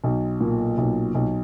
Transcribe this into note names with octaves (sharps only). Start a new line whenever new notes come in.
B1
A#2
B1
B1